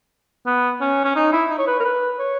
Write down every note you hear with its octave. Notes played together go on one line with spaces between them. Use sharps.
B3
C#4
C#4
D#4
E4
D#4
C#5
B4
A#4
B4
C#5